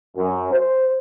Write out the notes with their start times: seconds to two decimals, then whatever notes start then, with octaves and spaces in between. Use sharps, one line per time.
0.17 F#2
0.52 C5